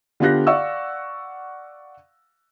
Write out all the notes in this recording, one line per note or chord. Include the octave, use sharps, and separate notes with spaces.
D3 B3 F4 G4 F#6 A#6
D5 F5 F#5 C#6 E6